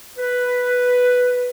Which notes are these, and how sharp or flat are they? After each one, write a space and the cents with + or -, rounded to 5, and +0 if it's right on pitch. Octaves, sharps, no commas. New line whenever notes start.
B4 +0